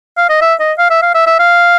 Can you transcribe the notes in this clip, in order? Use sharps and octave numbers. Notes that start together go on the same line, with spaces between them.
F5
D#5
E5
D#5
F5
E5
F5
E5
E5
F5